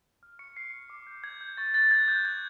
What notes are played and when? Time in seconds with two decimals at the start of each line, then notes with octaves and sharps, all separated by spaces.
0.23 F6
0.39 C#6 C#7
0.57 C#6 C7
0.74 F6
0.90 D6
1.07 G6
1.24 G6 G#6
1.41 G6
1.57 C#6 A6
1.74 F#6 A6
1.91 F#6 G#6
2.08 F#6 G6
2.25 G6 G#6